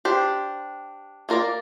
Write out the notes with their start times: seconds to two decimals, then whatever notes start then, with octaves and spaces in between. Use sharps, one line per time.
0.05 D4 G4 C5
1.29 A#3 F4 A#4 D5